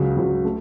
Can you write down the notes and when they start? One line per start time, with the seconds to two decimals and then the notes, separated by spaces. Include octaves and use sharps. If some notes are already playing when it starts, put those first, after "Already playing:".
Already playing: C#2 C#3 F#3
0.17 C#2 C#3 F#3
0.45 A3